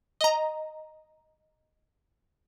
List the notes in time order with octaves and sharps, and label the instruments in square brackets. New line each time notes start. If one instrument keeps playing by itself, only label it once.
[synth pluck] D#5 A#5